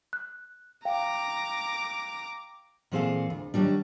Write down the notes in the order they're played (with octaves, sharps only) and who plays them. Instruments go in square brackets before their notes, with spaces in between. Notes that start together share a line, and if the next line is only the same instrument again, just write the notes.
[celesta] F#6
[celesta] F5 G5 [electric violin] A#5 D6
[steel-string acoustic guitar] A#2 E3 C4 G#4 A4 F5
D2
D#3 F#3 G3 D4